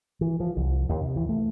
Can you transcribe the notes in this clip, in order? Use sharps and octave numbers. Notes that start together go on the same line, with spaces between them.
E3
F3
C2
D#2
C3
E3
A3